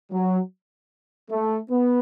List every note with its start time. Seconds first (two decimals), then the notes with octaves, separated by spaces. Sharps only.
0.12 F#3
1.31 A3
1.70 B3